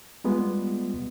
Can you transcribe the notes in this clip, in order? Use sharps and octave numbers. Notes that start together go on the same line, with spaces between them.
G3 G#3 B3 F4